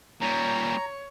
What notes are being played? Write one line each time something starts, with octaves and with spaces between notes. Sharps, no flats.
A#2 G3 C#5 A#5